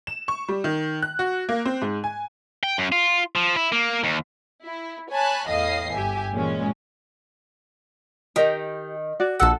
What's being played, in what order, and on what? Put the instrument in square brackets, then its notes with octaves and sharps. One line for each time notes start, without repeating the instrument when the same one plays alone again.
[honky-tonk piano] E7
C#6
G3
D#3
F#6
F#4
A#3
C4
G#2
G#5
[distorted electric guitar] G5
F#2
F4
F3
E4
A#3
D#2
[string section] E4
C#5 G#5 A5 B5 F#6
E2 A2 D#5 F5 D#6 C7
G1 G4 E5 G#5
A#2 E3 G#3 C#4
[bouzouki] D#3 [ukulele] G4 A#4 D#5
[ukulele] F#4 [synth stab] D5
[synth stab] A#1 F#5 [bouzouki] A4 A5